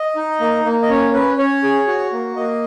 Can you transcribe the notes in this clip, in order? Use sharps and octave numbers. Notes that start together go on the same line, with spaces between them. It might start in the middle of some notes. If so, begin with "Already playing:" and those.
Already playing: D#5
D#4
A#3
A#3
D#5
C#4 C#5
C#4 B4
C#4 C#5
G#4
F#4
A#3
A#3 D#5